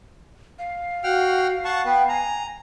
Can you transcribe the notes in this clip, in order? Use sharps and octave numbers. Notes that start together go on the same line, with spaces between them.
F5
F#4 F#5 G5 F6
F#5 A5 C#6
B3 B4 G5
G#5 A#5